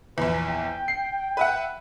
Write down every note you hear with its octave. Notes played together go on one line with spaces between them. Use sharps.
A#1 E2 B4
G5
C7
B4 E5 F#5